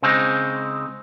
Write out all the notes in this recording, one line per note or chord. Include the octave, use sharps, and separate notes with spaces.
C#3 G#3 C4 D#4